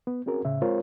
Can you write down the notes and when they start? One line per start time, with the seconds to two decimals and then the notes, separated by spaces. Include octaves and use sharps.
0.07 B3
0.26 C4 C#4 F#4 G#4 A#4
0.45 A2 C#3 E5
0.62 G#3 C4 F4 A#4 C5 C#5